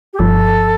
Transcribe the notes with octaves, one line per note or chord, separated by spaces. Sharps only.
G4
G1 G2 F3 A4